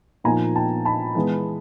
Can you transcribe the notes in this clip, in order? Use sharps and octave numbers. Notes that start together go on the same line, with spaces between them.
A#2 F3 A#3 D#4 G#5 A#5
G5 A5
A5 B5
E3 G#3 B3